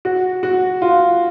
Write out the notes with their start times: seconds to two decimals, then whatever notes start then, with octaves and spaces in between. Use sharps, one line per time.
0.05 F#4
0.43 F#4
0.82 F4